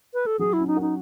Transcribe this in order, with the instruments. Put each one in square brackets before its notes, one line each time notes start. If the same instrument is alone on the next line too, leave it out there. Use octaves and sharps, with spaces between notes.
[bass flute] B4
A4
[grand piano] F#3 [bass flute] G#4
[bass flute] E4
[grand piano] C#4
[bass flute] D#4
[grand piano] F#4
[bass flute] D#4